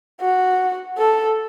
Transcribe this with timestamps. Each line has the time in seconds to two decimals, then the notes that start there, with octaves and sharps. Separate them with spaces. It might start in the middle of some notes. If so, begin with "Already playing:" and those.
0.21 F#4
0.98 A4